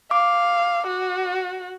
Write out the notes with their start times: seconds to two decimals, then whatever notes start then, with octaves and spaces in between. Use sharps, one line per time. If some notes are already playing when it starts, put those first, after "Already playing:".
0.11 F5 D6
0.87 F#4